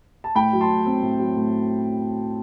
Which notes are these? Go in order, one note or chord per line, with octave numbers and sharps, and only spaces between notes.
A5
A2 G5 B5
F#3
A5 C6
A2
C4
A2
F#3
A2